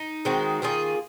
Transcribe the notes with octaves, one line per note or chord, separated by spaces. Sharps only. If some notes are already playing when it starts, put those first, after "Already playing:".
Already playing: D#4
D#3 G#3 C4 F#4
D#3 A#3 F4 G#4